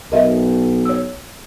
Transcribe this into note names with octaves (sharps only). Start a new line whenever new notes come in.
B1 A#4 D#5 E5
C#5 E6